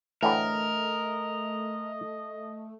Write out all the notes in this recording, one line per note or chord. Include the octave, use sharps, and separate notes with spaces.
A2 D3 E3 A3 A#4 D#5